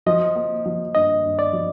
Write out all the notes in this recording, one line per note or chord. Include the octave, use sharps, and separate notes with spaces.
F3 D#5
A#3
F3
G2 D#5
G2
D5
F3